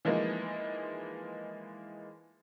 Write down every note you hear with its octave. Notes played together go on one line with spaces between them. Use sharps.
E3 F3 G#3 A#3 D#4